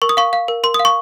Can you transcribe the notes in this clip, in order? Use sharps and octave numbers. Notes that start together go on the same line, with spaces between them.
A#4 C#6
D#6
F5 C#6
F5
A#4
A#4 C6
D#6
F5
C#6